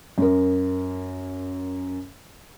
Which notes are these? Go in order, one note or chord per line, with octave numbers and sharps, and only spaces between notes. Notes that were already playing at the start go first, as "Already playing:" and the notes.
F#2 A#4